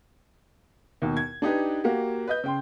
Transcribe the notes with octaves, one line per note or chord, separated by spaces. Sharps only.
D#2 B2
G#6
D4 D#4 G4 B4
A#3 F#4 G4
B4 D#5 G6
C#3 G5 C6